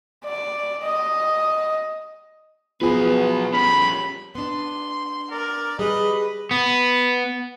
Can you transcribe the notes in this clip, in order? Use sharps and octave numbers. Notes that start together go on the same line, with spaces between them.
D5
D#5
F3 F#3 B3 G#4 B4
G3 C#4 B5
B3 D4 C6
A#4 D5
G3 G#4 B4 D#5
B3